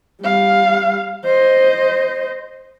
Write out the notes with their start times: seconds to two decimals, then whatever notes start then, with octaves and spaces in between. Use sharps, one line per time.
0.21 G3 F5
1.24 C5 D#5